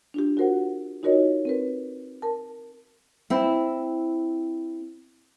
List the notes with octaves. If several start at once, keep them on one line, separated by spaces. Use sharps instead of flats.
D4 F4 G4
F4 F#4 A#4 C5 F#5
D#4 F4 F#4 A#4 C#5 D#5
C4 A#4 B4
A#4 A5
C4 E4